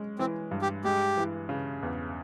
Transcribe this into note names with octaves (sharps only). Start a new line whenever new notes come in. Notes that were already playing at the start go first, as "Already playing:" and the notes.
Already playing: G#3 C#4
E3 C4
G2
G4
G#3 G4
E3
C#3
E2